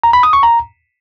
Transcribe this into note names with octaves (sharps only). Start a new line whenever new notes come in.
A#5
B5
D#6
C#6
A#5